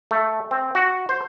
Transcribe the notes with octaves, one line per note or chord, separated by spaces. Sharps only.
A3
C4
F#4
C5